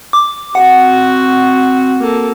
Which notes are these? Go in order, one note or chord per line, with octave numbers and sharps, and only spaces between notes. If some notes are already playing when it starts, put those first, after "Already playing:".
D6
C4 F#4 F#5
A#3 A4